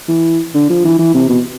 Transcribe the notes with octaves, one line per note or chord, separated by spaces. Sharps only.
E3
D3
F3
E3
E3
C3
B2